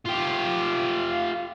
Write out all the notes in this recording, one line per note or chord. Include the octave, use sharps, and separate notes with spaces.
F4 G4